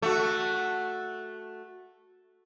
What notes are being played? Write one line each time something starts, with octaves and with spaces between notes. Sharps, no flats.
A3 F#4